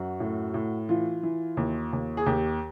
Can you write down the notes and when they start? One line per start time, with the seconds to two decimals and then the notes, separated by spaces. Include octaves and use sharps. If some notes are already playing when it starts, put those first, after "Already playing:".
Already playing: F#2 F#4
0.20 A2
0.54 A2
0.89 E3 F4
1.23 E3
1.57 D#2
1.93 D#2
2.17 G#4
2.26 D#2 G4